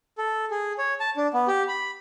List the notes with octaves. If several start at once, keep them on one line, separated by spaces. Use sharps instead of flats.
A4
G#4
C#5
A5
D4
B3
G4
B5